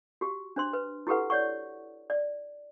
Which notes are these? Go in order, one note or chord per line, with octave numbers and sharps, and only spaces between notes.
F#4 G4
D4 C5 C6
B4
E4 F#4 G4 A4 B4 F#5
C#5 D5 F#5 C#6
D5